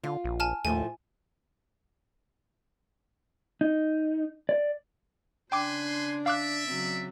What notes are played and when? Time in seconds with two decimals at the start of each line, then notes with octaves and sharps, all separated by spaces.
0.03 D3 F4
0.24 A#1
0.40 G#5 A5 F6
0.65 D#2 A2 F3 A3 G#5
3.61 D#4
4.49 D5
5.52 C#3 D4 B4 G5 G#5 C6 D6
6.26 D5 E5 F5 D6 F#6
6.67 C#3 F#3 C4